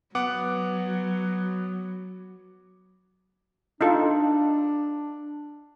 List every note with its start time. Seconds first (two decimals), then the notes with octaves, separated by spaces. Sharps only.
0.15 F#3 B3 F#5 D6
3.81 D4 D#4 F4 A4